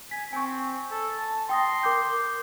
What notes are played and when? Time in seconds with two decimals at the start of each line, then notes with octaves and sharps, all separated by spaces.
0.11 G#5 B6
0.33 C4 G#5 C#6
0.91 A4
1.18 A5
1.49 G5 C6 D#6 A#6
1.83 A#4 D6 G6